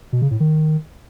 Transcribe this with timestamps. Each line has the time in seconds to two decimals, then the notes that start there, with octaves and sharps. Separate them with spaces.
0.13 B2
0.22 C#3
0.31 A2
0.40 D#3